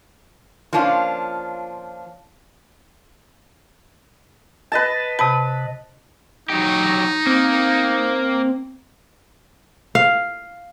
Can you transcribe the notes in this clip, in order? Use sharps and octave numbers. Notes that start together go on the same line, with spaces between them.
F3 A#3 C#4 D4 E4 F4
B4 D#5 A5
C3 A5 B5
F#3 D#4 G4
A#3 C4
F5